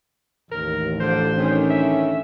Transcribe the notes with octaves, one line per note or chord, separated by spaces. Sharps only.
A1 D#2 A#4
D3 F3 C5
D3 D#3 C#4
E5